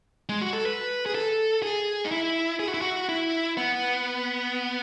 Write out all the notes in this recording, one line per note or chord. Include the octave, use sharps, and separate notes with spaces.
G#3
F#4
A4
B4
G#4
A4
G#4
D#4
E4
G#4
F#4
E4
F#4
E4
B3